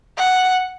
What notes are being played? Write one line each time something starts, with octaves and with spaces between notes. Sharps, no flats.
F#5